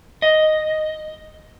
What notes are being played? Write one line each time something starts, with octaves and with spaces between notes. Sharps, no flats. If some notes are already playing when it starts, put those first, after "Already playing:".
D#5